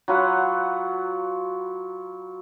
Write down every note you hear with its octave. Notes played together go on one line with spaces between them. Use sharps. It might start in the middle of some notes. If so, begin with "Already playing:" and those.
F#3 F4 B4 F#5